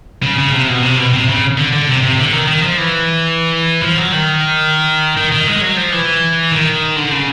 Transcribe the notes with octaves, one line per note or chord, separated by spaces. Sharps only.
C#3
C#3
C3
B2
C3
B2
C3
C#3
D3
D3
C3
C3
D3
D#3
D#3
F3
E3
F3
F#3
D#3
D#3
D#3
G#3
F#3
F3
E3
D#3
D3
C#3